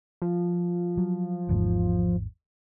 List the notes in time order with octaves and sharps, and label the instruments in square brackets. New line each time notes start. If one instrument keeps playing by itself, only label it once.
[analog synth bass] F3
[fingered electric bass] F#3
G#1 E2 G#2